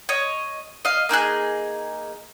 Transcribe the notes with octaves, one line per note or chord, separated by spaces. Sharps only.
C#5 D#5
D#5 F5
A#3 D#4 G#4 F#6